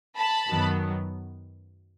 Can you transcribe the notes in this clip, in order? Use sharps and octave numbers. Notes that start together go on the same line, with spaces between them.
A5 B5
F#2 D#3 F#3 B3